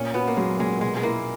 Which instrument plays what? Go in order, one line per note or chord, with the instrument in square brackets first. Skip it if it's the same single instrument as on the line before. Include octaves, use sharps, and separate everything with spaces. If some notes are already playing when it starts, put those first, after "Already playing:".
Already playing: [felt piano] A#2 [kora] C#4
[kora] B3 [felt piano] F#4
[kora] A#3
[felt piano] F#3 [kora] G#3
[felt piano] A#2 [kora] G#3
[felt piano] B2 [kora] G#3
[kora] G#3
[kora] A#3 [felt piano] E4